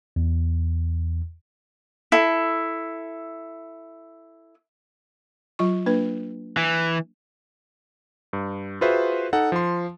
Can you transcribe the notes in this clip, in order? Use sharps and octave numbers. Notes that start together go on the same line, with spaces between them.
E2
E4 A4
F#3 F4 C#6
A#3 D4 B4
E3
G2
F4 F#4 G#4 B4 C5 E5
D#4 A4 F#5
F3 C6